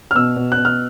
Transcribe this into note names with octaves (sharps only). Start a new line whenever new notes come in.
F6
B2 E6
B2
F#6
B2
F6